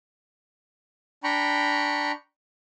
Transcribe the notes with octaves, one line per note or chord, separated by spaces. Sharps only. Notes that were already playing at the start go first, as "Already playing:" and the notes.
D4 G5 A#5 B5 C#6